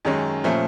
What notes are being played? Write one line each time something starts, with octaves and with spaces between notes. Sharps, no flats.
F#2 D#3 G#3 C#4
A#2 F3 A3 C#4